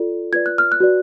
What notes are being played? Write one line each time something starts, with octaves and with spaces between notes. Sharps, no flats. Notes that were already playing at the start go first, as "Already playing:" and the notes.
Already playing: F4 A4 D5
F4 B4 D5 G#6
F#6
F6
F#6
F#4 B4 D5